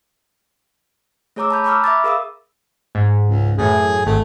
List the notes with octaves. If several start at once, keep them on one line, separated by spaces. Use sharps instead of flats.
A3 G#4 C#5 A#5 D6 E6
A5 B5 G6
A#5 B5 C#6 D6 E6 F6
E5 B5 D6 A6
G#4 A#4 F5 D#6 E6
G#2
C#2
F#2 A2 E3 G#4
G#1 A3